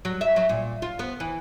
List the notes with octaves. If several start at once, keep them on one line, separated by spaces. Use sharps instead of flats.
F#3
E5
F#3
A#2
F4
B3
E3